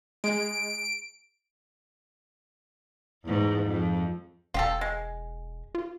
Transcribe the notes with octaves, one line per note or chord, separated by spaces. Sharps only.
G#3 D7
E2 G#2
F2
E1 F4 G4 A4
G#3
F4